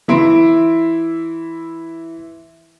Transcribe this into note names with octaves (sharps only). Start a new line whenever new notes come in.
E3 E4 C6 D7